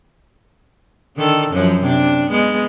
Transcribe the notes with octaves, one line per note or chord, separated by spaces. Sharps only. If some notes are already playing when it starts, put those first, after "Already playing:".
D3 D#3 A4
F#2 F3 F#3
C3 D4
G#3 B3